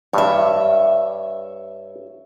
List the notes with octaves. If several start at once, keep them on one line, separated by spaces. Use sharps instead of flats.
G2 C#5 E5